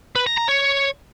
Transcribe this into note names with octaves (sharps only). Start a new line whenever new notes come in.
B4
A#5
A#5
C#5